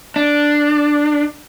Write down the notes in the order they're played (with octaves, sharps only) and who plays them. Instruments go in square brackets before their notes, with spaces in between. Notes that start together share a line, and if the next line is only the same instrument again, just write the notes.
[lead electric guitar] D4